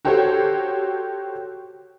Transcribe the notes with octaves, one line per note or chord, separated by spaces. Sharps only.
F#4 G4 A4 C5 C#5